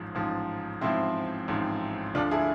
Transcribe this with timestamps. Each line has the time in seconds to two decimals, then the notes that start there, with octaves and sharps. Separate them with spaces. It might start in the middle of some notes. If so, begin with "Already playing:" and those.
Already playing: A1 G#2 F3
0.15 A1 G#2 F3
0.81 A1 G#2 F3 C4 E4
1.48 A1 G#2 F3
2.15 D2 D3 F3 D4 F4
2.31 E4 G#4